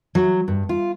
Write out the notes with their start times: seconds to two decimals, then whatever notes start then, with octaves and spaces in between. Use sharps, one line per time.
0.15 F#3
0.48 G2
0.69 F4